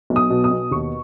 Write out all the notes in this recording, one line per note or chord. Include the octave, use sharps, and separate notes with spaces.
B1
D#6
B2
D#6
B2
D#2 C#6